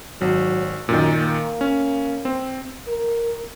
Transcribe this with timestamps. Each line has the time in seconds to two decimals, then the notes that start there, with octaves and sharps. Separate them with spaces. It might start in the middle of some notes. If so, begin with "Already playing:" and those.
0.21 G#1 F#3
0.89 F#2 A#2 D#3
1.21 A#3
1.61 C#4
2.25 C4
2.87 A#4